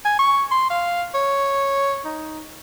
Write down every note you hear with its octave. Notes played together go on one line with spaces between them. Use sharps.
G#5
C#6
C6
F5
C#5
D#4